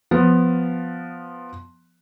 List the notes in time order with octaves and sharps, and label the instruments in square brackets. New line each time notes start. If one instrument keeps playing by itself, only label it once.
[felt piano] F3 B3